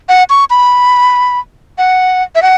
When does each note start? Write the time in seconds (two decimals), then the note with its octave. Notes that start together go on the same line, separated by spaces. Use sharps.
0.09 F#5
0.30 C#6
0.50 B5
1.78 F#5
2.35 E5
2.42 F#5